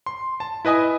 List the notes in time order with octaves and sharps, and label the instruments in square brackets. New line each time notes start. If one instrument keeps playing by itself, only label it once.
[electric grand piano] C6
A5
E4 B4 D#5 G#5 D#6